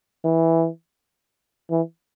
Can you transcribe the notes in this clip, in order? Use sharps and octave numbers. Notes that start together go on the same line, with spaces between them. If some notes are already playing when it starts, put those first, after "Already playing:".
E3
E3